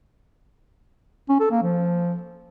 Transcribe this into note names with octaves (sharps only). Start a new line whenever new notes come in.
C#4
A4
A#3
F3